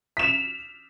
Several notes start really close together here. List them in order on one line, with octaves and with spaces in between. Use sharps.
B6 E7 F7